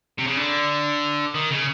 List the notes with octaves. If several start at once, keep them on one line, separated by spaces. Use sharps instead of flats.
C3
C#3
D3
D#3
C#3